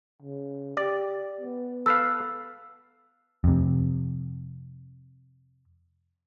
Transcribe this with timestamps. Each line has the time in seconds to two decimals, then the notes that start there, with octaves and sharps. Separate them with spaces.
0.22 C#3
0.77 G4 D5
1.41 B3
1.86 A4 B4 F5 E6
3.44 F2 C3